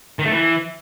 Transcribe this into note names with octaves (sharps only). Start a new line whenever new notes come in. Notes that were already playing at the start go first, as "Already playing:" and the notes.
D#3
A3
E3